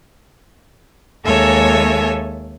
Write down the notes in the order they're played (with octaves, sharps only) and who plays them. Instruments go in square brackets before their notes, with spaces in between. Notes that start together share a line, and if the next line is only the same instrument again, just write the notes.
[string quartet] D#2 G#3 A4 C#5 E5 G#5